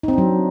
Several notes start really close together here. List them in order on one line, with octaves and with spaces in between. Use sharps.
D#4 C4 D4 F#3